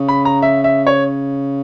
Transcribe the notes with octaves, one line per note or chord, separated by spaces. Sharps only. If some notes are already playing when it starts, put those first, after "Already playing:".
Already playing: C#3
B5
A#5
E5
E5
C#5